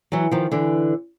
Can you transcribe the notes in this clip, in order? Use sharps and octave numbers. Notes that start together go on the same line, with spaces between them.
E3 F#3
D#3 F3
D3 E3